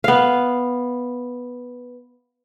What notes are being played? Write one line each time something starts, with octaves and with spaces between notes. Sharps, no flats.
B3 F5